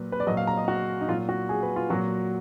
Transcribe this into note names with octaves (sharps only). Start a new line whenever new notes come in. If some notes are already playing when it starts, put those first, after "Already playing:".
Already playing: A#2 F#3 B4
B4
D5
A#2 F#3 D#5
F5
A#5
D#5
F#4
D#4
A#2 F#3 F4
F#4
G#4
B4
F4
A#2 F#3 F#4